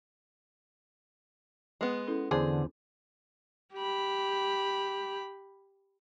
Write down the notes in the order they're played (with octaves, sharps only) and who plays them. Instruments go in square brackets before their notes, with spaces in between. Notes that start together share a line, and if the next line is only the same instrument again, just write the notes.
[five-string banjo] G#3 B3
[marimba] C#4 E4 A4
[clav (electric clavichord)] E2 C5 D5 [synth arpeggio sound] D3 [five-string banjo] G#4
[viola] G4 B5